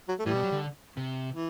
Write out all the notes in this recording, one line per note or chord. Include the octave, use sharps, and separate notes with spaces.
F#3
A3
A2 E3 G3
B2
F#3
D3
C3
E3